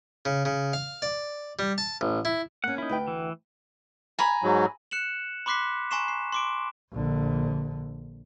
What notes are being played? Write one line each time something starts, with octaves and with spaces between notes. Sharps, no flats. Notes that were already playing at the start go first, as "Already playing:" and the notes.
C#3
C#3
F5
D5
G3
A5
A1
E4
A#3 C#4 F#5
D#4 E4
D2 B4 G5
E3
G#5 A#5 B5
G#2 F#3
F#6 C#7 E7 F#7
B5 C6 D6 F#6 B6 C7
G#5 A#5 C6 C#6 C7 E7
C7
C6 D6 D7
A#1 D3